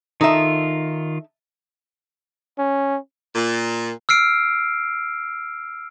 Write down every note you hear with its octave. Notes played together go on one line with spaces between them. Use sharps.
D#3 D#4 F4 A4 E5
C#4
A#2
E6 F6 C7 D7